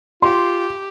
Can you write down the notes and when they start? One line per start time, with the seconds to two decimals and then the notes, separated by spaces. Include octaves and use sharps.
0.22 F4 G4 C6